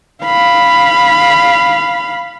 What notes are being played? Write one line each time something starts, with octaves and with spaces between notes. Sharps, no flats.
F5 B5